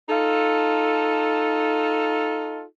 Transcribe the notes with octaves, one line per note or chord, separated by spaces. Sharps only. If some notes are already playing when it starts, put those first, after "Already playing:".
D#4 F4 A4